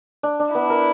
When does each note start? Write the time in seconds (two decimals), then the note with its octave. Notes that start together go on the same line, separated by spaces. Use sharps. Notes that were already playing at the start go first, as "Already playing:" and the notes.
0.23 D4
0.40 D4
0.54 B3 E4
0.70 A#4